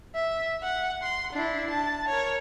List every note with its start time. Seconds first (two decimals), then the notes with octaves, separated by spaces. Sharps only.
0.15 E5
0.63 F#5
1.03 C6
1.33 D4 E4
1.70 A5
2.09 A#4 C#5